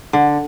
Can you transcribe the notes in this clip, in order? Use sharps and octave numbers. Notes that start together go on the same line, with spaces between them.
D3